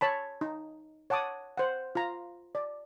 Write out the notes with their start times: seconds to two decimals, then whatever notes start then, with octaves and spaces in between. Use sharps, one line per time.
0.01 C#5 A5 B5
0.41 D#4
1.10 C#5 F#5 A5 D6 D#6
1.57 C5 F#5
1.95 F4 A#5
2.55 D5